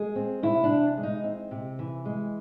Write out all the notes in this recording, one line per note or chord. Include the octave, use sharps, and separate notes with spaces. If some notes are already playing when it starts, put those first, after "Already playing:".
Already playing: G#3 G#4
C4
C3 E4
D4
E3
G#3
D#4
C4
C3
E3
G#3